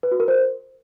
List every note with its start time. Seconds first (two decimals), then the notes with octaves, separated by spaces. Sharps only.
0.03 B4
0.12 F#4
0.20 A#4
0.28 C5